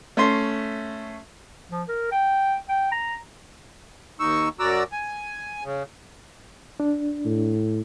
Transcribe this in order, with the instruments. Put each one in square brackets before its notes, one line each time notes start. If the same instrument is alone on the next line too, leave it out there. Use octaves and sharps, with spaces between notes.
[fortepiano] A3 C#4 C6
[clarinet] F3
A#4
G5
G5
A#5
[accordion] D#2 D#4 C#6 E6
F#2 F#4 D5 A#5 E6
G#5
C#3
[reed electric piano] D4
[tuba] A2